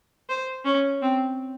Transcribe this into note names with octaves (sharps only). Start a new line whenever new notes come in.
C5
C#4
C4